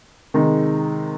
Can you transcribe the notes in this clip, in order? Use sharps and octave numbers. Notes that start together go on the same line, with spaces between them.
C3 D#3 G#3 D#4